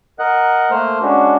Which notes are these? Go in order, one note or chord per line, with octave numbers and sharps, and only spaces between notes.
A#4 D#5 F#5 F#6
A3 A#3 C5 F6
G#3 C#4 D4 F#4